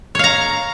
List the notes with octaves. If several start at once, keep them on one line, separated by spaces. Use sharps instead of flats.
C#5 F5 A#5